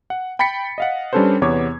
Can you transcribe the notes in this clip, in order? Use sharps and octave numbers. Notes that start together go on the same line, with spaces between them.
F#5
G5 B5 A6 B6 C#7
D#5 F5 F#5
G3 C#4 D4 A4 B4 C5
E2 C3 B3 C#5 D6 G#6